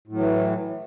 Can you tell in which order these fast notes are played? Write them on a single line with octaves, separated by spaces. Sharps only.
A2 F#3 E3